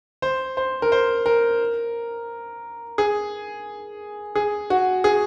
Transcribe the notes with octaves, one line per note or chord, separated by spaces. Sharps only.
C5
C5
A#4
C5
A#4
G#4
G#4
F#4
G#4